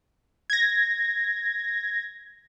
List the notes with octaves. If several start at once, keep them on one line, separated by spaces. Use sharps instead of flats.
G#6 A#6